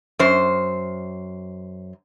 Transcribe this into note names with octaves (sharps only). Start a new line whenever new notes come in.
F#2 C5